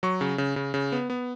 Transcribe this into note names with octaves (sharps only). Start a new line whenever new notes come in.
F#3 C#6
C#3
C#3
C#3
C#3
B3
B3